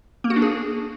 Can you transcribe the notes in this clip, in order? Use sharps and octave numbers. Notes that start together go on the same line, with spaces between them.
A#3
F#4
D4
G#4